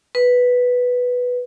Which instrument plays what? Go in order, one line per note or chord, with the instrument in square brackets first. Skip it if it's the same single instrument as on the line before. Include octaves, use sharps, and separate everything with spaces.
[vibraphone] B4